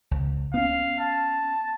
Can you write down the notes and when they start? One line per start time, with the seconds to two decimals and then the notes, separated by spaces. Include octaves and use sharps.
0.11 C#2
0.54 B3 C#4 F5
1.00 A5